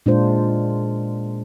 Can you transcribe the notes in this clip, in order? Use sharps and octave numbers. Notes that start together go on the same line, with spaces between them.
A#2 G#3 D4 F4 C5